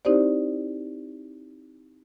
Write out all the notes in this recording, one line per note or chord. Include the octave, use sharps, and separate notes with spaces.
C4 D#4 E4 G4 C5 D5